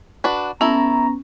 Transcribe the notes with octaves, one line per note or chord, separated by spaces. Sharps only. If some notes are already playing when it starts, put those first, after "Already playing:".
D4 F#4 B4
B3 C#4 E4 A4 A#5